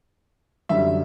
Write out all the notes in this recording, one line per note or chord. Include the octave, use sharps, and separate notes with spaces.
F#2 D3 G3 E5